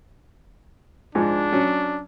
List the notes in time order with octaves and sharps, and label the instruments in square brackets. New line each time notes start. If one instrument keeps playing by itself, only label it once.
[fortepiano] G#2 F3 G#3 [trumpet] D4
[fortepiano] F#3 C#4